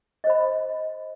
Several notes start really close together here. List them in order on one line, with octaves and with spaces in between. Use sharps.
D#5 C5 B5